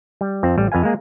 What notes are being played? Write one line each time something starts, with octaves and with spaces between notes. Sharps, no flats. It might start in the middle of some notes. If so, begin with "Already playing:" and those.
G3
F2 C4
A1 G3
F2 B4 F5 G#5
G#3 A#3 G#4